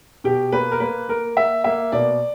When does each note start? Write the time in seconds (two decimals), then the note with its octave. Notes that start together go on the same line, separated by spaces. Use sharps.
0.24 B2 G4
0.52 A#3 B4
0.71 A#4
0.80 A#3 B4
1.08 A#3 A#4
1.36 A#3 E5
1.64 A#3 E5
1.92 B2 D5